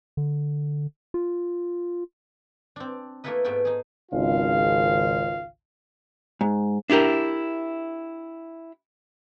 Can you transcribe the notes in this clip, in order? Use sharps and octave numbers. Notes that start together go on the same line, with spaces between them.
D3
F4
C4 D4
A3 A#3 E4 A4 B4 D#5
G#2 A3 B3 B4 E5 G5
D#4 G#4
G#1 C#2 F4 F5
G#2
D4 E4 G4 A#4